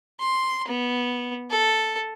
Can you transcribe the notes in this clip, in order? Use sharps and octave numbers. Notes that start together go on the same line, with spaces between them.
C6
B3
A4